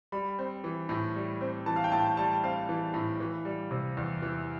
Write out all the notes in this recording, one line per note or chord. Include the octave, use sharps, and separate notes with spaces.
G3 B5
C4
E3
A2
G3
C4
E3 A5
F5
G5
A2 A5
G3 A5
C4 F5
E3
A2
E3
G3
C3
E2
E3